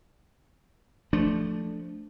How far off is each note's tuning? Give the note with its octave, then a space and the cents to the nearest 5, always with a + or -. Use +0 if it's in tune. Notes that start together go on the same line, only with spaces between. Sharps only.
F3 +0 A3 +0 D4 +0